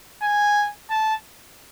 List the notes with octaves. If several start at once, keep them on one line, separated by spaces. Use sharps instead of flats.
G#5
A5